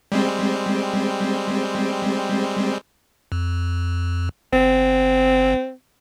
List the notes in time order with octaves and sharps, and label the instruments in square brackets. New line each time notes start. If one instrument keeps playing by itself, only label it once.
[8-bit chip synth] G3 G#3 C4
F2
[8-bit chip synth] G1 [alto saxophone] C4